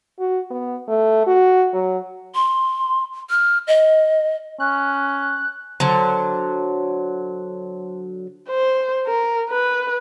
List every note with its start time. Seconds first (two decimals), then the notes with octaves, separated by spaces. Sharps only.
0.19 F#4
0.51 B3
0.88 A3
1.27 F#4
1.73 F#3
2.35 C6
3.30 F6
3.68 D#5
4.60 C#4 F#6
5.80 D3 F#3 C5 A5 C6
8.49 C5
9.07 A#4
9.50 B4